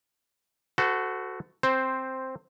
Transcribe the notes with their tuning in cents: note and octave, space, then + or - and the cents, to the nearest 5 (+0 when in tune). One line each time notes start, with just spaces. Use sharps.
F#4 +0 A4 +0 C5 -40
C4 +0 C5 +0